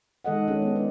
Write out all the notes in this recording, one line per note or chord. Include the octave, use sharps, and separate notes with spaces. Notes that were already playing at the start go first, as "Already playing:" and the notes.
D#3 G#3 A4 D#5 F#5
G#3 C#4 D4 G4
G#3 B3
D4